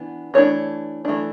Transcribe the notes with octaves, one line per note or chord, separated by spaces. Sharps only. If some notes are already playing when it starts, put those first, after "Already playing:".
Already playing: E3 B3 D4
E3 A3 D4 C#5
E3 A3 D4